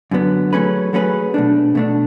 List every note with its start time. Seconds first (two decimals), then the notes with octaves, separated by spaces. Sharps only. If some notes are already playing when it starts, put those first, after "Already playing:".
0.11 F#2 D3 F#3 B3
0.53 F#3 A3 C#4 G#4 B4
0.93 F#3 A3 C#4 G#4 B4
1.34 B2 A3 D4
1.75 B2 A3 D4